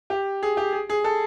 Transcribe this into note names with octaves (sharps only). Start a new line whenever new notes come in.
G4
G#4
G4
G#4
G#4
A4